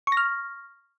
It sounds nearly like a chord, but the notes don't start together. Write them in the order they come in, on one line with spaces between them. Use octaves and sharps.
C#6 A#6 F6